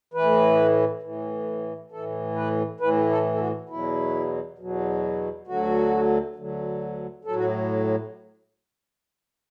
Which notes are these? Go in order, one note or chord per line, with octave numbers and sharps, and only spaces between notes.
A2 E3 B4
A2 E3
A2 E3 A4
B4
A2 E3 B4
A4
A4
F#4
E2 B2 F#3 E4
E2 B2 F#3
D2 D3 F#3 F#4
D2 D3 F#3
A2 F#3 A4
F#4